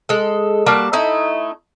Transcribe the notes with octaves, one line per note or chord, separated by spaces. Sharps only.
G#3 A4
G3 A#3 F#4 A5
A3 D#4 E4